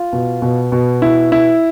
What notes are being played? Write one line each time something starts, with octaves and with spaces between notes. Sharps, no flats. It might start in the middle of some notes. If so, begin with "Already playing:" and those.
Already playing: F4
B2
B2
B2
E4
E4